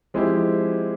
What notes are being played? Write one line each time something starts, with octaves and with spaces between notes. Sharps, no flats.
F3 G#3 C4 E4 G4